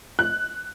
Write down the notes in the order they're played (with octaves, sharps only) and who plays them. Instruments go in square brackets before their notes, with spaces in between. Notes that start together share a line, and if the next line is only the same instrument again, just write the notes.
[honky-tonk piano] F#6